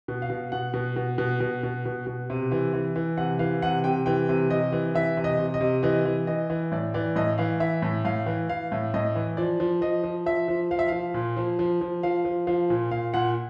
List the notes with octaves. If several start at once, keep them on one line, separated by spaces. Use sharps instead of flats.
B2
F5
B2
B2 F#5
B2
B2
B2
B2
B2
B2
B2
C3
E3
E3
E3
C3 F#5
E3 F5
C3 F#5
C3 G5
E3 G5
C3
C3 D#5
E3
E3 E5
C3
D#5
C3
D#5
C3
E3 D#5
E3
E3 D#5
E3
A2 D5
E3 D5
A2 D#5
E3 F5
E3 E5
A2
A2 F5
E3
E3 F5
A2
A2 D#5
E3
F3 D5
F3
F3 D#5
F3
F3 E5
F3
F3 F5
E5
F3 F5
A#2
F3
F3
F3
F3 F5
F3
F3 F5
A#2
A#2 F5
A#2 F#5